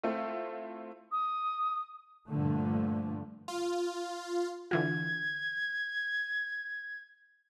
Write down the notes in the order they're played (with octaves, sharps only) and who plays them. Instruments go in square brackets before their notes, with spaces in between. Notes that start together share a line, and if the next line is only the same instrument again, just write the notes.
[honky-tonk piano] A3 C4 E4 F4
[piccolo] D#6
[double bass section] G2 A#2 D3 F3 A3
[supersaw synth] F4
[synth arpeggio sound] D3 E3 F4 [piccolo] G#6